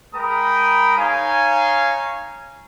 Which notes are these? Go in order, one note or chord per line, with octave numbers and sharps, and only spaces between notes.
G#3 A#4 G5 A#5 B5 D#6
D#4 C#5 F5 G#5